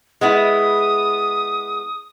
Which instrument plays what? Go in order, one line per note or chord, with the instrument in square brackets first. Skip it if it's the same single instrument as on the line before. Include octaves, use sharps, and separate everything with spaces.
[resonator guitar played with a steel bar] G#3 B3 E4 [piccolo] D#6